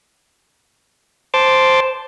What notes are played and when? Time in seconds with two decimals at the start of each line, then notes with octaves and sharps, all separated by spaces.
1.34 C5 A5 C6 D6